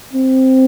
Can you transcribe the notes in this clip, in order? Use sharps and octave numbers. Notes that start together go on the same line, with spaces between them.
C4